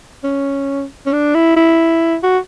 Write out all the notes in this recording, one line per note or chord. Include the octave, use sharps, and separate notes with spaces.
C#4
C#4
D4
E4
E4
F#4